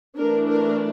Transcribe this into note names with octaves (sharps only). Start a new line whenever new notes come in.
E3 A3 D4 A#4
A#4